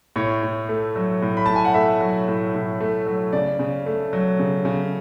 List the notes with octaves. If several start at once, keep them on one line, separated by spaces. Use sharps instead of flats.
A2 C#5
A2
A3
F#3
A2
B5
A2 A5
G#5
F#5
A3 E5
F#3
A2
A2
A3
F#3
C#3 D5
C#3
A3
F#3
C#3
C#3